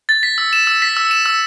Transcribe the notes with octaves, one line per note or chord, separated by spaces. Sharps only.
A6
B6
E6
E7
E6
B6
E6
E7
E6